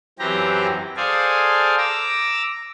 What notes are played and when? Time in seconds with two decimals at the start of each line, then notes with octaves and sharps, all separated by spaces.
0.19 F#2 E3 C4 G4 A#5
0.96 G#4 A4 C5 D5 F5 G#5
1.78 A#5 D6 E6